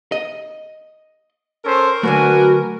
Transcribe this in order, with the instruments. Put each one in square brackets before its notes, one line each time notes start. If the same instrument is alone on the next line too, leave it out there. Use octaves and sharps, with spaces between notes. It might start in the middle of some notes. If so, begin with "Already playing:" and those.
[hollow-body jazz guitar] D#5
[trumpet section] C#4 A4 C5 [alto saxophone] A#4
[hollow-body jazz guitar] D3 F#3 A3 [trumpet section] D4 B4 G#5 [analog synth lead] F#4